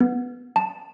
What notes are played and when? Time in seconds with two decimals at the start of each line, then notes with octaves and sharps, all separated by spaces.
0.01 B3
0.56 A5